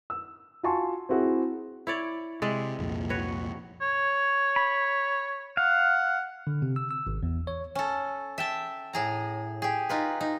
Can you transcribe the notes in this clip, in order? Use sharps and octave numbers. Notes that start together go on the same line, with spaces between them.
E6
F4 F#4 G#5 A5 C6 C#6
C4 E4 F#4 G#4
E4 C#5 D5
C3 G#3 D5 E5
C2 F2 A#2
F#4 B4 C#5
C#5
B5
F5 F#5
D3
C3
E6
E6
G#1
E2
C#5
C#4 A4
E5 G5 A5
A2 G#4 A#5
G4 G#4
D#4 F4 B4
D#4